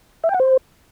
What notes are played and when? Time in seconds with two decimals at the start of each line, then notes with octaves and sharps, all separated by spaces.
0.24 E5
0.29 G5
0.34 F#5
0.40 C5